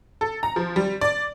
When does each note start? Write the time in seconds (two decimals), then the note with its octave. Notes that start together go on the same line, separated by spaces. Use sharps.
0.21 A4
0.43 A#5
0.56 F3
0.76 G3
1.01 D5